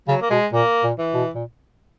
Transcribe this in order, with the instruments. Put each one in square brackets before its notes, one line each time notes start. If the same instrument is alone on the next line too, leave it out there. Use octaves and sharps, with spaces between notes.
[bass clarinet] C#3 [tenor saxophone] F#3
[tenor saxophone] A#3
[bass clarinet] B2 [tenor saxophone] G#3
[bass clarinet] A#2 [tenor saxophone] A#3
[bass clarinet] A#2
[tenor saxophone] E3
[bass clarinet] B2
A#2